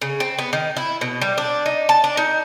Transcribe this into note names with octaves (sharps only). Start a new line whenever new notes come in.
C#3
C4
B3
D#3
E4
B2
G3
D4
D#4
A5
D4
D#4